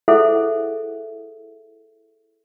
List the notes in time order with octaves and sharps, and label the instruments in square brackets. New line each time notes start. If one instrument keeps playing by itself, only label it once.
[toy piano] E4 G#4 A4 C5 E5 F#5